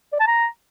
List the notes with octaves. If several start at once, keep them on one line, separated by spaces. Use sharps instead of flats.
D5
A5
A#5